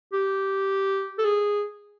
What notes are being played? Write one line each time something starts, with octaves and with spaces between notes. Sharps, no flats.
G4
A4
G#4